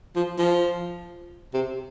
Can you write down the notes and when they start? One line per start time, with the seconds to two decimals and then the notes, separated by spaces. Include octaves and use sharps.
0.16 F3
0.38 F3
1.54 C3